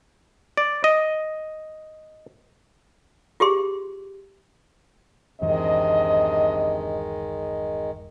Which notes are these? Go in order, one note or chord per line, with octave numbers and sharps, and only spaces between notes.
D5
D#5
F4 G4 G#4 C6
D1 F#2 C3 D#3 E3 G#3 D4 D#5